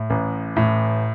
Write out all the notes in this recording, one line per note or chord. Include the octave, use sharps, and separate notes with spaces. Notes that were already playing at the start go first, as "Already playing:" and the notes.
Already playing: A2
A1
A2